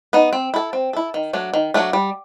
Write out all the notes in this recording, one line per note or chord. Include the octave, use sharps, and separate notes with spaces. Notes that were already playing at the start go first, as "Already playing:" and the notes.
B3 D#4
C4
E4 A4
C4
E4 A4
D#3
F#3 A3 D4
D#3
F#3 A3 D4
G3